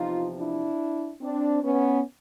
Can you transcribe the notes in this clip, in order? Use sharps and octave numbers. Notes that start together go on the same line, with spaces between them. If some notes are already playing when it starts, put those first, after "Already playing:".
Already playing: E2 C3 F3 D#4 F4
D4 E4
C4 D4
B3 C#4